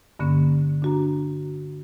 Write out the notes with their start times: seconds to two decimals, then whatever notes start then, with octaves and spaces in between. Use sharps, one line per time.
0.19 G2 D3 A#3 C#4
0.82 D4 F#4 A#5